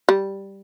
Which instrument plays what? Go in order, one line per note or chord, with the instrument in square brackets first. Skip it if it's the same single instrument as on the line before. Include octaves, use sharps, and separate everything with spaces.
[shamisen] G3